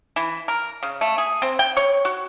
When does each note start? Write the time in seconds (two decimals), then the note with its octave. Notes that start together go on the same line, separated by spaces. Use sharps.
0.16 E3
0.48 A#4
0.83 C#3
1.01 A3
1.18 G#4
1.42 C4
1.59 G5
1.77 C#5
2.05 F#4